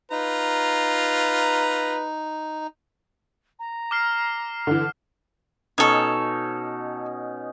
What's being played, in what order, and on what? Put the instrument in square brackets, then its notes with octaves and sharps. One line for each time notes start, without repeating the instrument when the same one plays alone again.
[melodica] D#4 [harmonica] F4 A#5 [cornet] B4
[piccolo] A#5
[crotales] D6 F6 C7
[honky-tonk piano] D3 E3
[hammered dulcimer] B2 C#4 D#4 [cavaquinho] A4 C#5